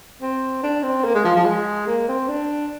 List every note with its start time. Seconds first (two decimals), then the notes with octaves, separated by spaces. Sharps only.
0.22 C4
0.63 D4
0.83 C4
1.05 A#3
1.15 G#3
1.25 F3
1.36 F3
1.46 G#3
1.87 A#3
2.08 C4
2.28 D4